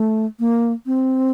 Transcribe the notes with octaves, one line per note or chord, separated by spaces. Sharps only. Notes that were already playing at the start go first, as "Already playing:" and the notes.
Already playing: A3
A#3
C4